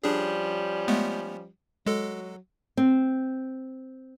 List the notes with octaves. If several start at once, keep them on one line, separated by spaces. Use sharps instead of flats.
F3 G3 C#4 D4 G#4
G#3 A3 B3
F#3 G#3 A4
C4